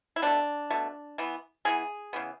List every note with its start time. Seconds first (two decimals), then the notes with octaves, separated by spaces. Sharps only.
0.16 E4
0.22 B2 A3 D4
0.70 B2 A3
1.18 E3 B3
1.65 E3 B3 G#4
2.13 C#3 E3 B3